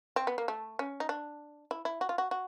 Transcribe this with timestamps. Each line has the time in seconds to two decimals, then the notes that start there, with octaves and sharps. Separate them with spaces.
0.16 C4
0.27 B3
0.38 A#3
0.48 A3
0.79 C#4
1.00 D#4
1.09 D4
1.71 E4
1.85 E4
2.01 F#4
2.09 F4
2.18 F#4
2.31 F#4